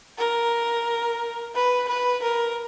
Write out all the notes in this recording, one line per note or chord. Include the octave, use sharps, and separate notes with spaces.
A#4
B4
B4
A#4